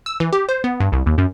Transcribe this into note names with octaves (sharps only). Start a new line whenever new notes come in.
E6
E3
G4
C5
B3
G2
C2
D#2
F#2